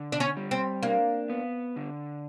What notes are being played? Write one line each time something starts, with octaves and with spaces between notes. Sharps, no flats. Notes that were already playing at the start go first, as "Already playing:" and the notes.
Already playing: D3
D4
C#4
G3
C4
A#3 D4
B3
D3